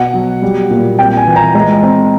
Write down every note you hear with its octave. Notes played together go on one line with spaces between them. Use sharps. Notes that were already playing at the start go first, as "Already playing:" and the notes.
Already playing: B2 F#5
F#3
G3
A#2
C4 G5
G#5
E3
A#5
G#3 A#5
C4